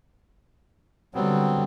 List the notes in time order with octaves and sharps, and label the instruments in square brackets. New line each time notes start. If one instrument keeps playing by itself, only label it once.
[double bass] D3 G3 [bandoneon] F#3 B3 C4